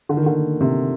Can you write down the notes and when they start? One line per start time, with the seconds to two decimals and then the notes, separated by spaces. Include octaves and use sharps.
0.09 D3
0.17 D#3
0.26 D3
0.61 C3